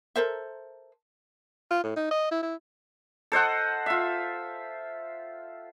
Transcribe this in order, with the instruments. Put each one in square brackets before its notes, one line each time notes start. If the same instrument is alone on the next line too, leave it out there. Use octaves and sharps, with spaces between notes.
[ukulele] A4 A#4 C5 E5
[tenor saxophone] F4
A2
D#4
D#5
E4
E4
[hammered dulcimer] A4 C5 D#5 F#5
F4 E5